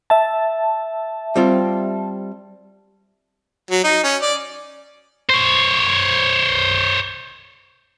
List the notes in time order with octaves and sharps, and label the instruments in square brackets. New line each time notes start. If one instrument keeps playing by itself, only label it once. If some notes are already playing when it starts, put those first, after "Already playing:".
[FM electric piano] E5 A5
[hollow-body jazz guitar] G3 C4 F4
[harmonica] F#3
D#4
C#4
D5
[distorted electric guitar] C5 C#5